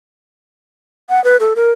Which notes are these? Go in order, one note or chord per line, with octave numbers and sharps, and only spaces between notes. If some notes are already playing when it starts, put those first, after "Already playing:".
F#5
B4
A4
A#4